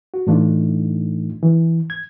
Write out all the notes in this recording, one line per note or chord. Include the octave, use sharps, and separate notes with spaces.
F#4
A2 E3 A3 D4 D#4 F4
E3
G#6